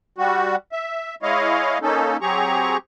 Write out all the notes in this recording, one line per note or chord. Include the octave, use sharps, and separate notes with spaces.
G3 F#4
E5
G#3 E4 C#5 D#5 F5
A#3 C#4 D#4 A4
F#3 C4 G4 G#4 A#5 C#6